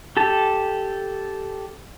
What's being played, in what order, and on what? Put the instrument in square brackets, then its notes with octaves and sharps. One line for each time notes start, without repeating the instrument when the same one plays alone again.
[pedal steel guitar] G4 A4 A5